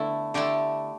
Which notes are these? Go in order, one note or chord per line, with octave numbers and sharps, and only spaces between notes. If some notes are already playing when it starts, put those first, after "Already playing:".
Already playing: D3 A3 B3 E4
D3 A3 E4 G4